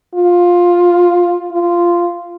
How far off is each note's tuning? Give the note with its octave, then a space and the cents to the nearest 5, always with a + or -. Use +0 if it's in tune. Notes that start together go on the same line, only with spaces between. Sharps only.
F4 +10
F4 -10